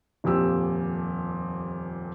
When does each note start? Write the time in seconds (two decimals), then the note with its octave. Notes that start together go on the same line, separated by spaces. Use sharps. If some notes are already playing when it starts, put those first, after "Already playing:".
0.24 D#1 F2 A#2 G4 E6